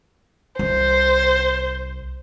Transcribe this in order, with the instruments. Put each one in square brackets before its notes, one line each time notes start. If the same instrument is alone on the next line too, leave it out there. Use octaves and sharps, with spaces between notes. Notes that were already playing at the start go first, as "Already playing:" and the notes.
[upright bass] C2 [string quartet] C5